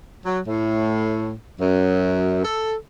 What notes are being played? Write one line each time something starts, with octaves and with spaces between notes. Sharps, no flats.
F#3
A2
F#2
A4